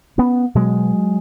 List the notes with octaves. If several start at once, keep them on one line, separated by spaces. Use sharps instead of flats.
B3 C#4
B2 F#3 G#3